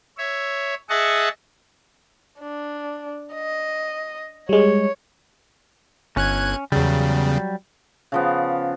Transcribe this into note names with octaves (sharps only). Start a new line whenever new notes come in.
C#5 E5
G#4 D#5 E5 F#5 A5 C#6
D4
D#5
G3 G#3 C#5
G1 C#4 F#6 G#6
E2 C#3 F#3 G3
C#3 F3 B3